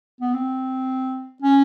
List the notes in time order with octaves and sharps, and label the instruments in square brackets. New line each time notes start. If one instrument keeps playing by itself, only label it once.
[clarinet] B3
C4
C#4